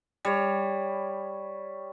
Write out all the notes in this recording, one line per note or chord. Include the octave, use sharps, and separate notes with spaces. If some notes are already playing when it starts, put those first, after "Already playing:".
G3 C#5